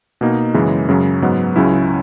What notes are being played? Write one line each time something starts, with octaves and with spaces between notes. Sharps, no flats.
B2 A#3 D#4
F#2 C#3 E3 G#3
F#2 C#3 F#3
G#2 F#3 B3
C#2 C#3 F#3 C#4 E4